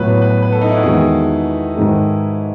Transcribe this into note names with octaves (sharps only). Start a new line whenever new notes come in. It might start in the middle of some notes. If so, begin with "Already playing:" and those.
Already playing: A2 F#3 B3 B4
B4
B4
A4
D#4
E4
F#4
E2 D#3 G#3 G#4
G#2 D#3 G#3